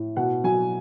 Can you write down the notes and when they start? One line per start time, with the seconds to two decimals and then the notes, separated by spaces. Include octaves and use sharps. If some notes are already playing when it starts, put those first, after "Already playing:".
Already playing: A2
0.17 B2 F#5
0.44 F#3 G#5